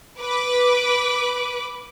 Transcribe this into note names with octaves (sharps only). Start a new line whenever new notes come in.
B4 D6